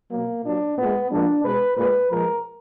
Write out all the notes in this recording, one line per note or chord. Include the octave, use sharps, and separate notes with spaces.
B2 F#3 A#3
A#2 F#3 D4
A#2 G#3 B3
A#2 F3 G#3 D4
B2 G#3 B4
A#2 G#3 B4
A#2 F3 G#3 A#4